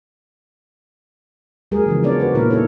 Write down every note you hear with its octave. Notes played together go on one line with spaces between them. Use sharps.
F#3 G#3 G#4 A#4
C#3 E3 F3
F#3 B3 D4 A#4 C#5 D5
F#4 B4
A#2 D#3 E4 A#4
D#4 E4 A4 C#5